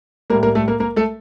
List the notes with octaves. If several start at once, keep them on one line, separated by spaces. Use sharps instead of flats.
A2 G3 A#3 A#4
A#3 A#4
A3 A4
A#3 A#4
A#3 A#4
A3 A4